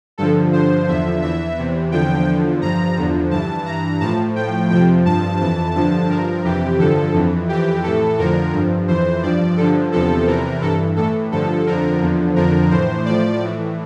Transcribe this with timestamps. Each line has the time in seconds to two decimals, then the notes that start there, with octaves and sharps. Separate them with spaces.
0.18 G2 D3 F3 A4
0.53 G2 D3 F3 C5
0.88 E2 D3 F3 E5
1.22 E2 E3 E5
1.57 E2 C3 E3
1.92 E2 D3 F3 G5
2.27 E2 D3 F3
2.62 G2 F3 A#5
2.97 E2 D3 F3
3.31 G2 E3 A5
3.66 G2 E3 A#5
4.00 A2 F3 A5
4.36 A2 F3 G5
4.70 F2 C3 F3 G5
5.05 G2 F3 A5
5.40 F2 E3 A5
5.75 G2 D3 F3 A5
6.09 G2 F3 A#4
6.44 F2 C3 E3 G4
6.79 G2 D3 F3 A4
7.14 F2 E3
7.49 F2 E3 G4
7.84 A2 E3 A4
8.18 F2 D3 F3 A#4
8.54 G2 F3
8.88 F2 E3 C5
9.23 G2 F3 D5
9.57 G2 D3 F3 A4
9.92 E2 C3 F3 A4
10.27 E2 C3 E3 A#4
10.62 G2 E3 A4
10.96 A2 E3 A4
11.32 G2 D3 F3 A4
11.67 F2 D3 F3 A#4
12.01 E2 D3 F3
12.36 F2 D3 F3 A#4
12.71 A2 E3 C5
13.05 A2 F3 D5
13.40 A2 E3